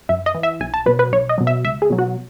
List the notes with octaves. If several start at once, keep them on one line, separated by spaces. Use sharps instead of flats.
F#2 E5
D#5
E3
E5
B1 G#5
A5
B2 F#3 B4
B4
B1 C#5
D#5
B2 F#3
E5
C#2 E5
G#4
B2 F#3
F#4